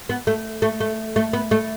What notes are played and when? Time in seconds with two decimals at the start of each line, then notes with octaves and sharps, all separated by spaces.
0.09 B3
0.27 A3
0.62 A3
0.80 A3
1.16 A3
1.33 B3
1.51 A3